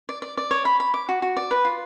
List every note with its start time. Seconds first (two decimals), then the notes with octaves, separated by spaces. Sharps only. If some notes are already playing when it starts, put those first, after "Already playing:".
0.09 D5
0.22 D5
0.37 D5
0.51 C#5
0.65 B5
0.80 B5
0.94 D6
1.09 F#4
1.22 F#4
1.37 D5
1.51 B4
1.65 F4